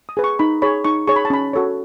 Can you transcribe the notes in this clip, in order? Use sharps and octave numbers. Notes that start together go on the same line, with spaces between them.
D#6
G#4 B4
C#6
D#4 B5
G#4 C#5 B5
D#4 C#6
G#4 C#5 C#6
B5
A5
C#4 B5
F#4 A4 C#5